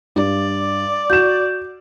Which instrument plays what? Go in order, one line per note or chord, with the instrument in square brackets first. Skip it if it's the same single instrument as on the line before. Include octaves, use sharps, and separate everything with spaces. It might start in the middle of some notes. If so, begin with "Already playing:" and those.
[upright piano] G2 [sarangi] D5
[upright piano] F#4 E7 [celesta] G6